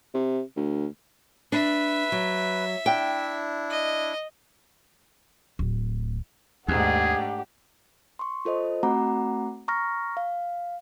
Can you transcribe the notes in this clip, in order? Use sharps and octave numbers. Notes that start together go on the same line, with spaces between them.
C3
D2
D4 B4 E5
F#3
D4 E4 G5
D#5
D1
D#2 G#2 A3 D4 G4 G#4 F#5
C6 C#6
F4 A4 C5 D#5
A3 C4 F#4 F#5 A#5 D6
A#5 C#6 F6 A#6
F5